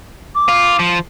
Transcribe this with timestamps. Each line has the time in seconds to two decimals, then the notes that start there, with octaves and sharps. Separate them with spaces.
0.35 D6
0.49 F4
0.79 F3